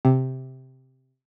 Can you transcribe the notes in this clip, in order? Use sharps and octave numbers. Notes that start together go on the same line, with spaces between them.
C3